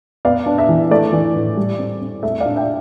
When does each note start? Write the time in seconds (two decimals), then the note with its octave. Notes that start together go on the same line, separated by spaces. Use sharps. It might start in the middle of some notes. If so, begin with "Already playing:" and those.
0.25 B3 D5 F5
0.46 D4
0.58 E5
0.69 E3
0.91 A3 D5
1.13 E3
1.36 A2
1.57 G3
1.79 C4
2.01 C4
2.23 A3 E5
2.40 D5 F5
2.46 D4
2.56 E5 G5